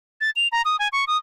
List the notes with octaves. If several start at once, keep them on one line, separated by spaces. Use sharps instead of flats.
A6
F7
A#5
D#6
G#5
C#6
D#6